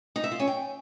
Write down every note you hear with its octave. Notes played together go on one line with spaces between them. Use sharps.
D#4
E5
F4
C#4
G5